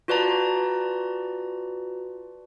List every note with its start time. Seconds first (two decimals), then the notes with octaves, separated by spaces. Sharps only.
0.08 F4 F#4 B4 D5 A5 A#5